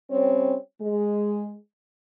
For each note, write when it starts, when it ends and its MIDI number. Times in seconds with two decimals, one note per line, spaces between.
0.11 0.54 55
0.11 0.54 60
0.11 0.54 61
0.11 0.54 73
0.79 1.54 56